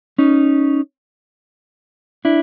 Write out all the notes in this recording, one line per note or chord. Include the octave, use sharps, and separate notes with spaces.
C#4 D#4
D4 E4